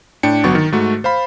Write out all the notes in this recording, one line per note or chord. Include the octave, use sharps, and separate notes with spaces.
A2 D4 G5 C#7
G1 F#3 B3 F#4 C#6 A6
D#3
G#2 A3 F#4
C5 F5 B5